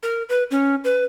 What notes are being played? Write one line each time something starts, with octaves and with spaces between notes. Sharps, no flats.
A#4
B4
C#4
B4